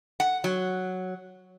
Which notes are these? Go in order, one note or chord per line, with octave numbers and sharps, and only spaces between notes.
F#5
F#3